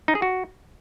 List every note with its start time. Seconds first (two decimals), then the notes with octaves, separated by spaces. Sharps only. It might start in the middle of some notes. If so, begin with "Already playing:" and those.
0.08 D#4
0.15 G#4
0.22 F#4